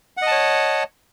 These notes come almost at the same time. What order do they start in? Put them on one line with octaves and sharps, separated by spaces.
F#5 D#5 A5 C#5